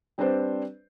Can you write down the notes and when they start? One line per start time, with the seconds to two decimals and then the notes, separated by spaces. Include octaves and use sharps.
0.18 G3 C4 D4 B4 C5 D5